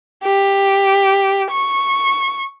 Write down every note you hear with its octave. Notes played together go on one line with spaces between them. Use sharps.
G4
C#6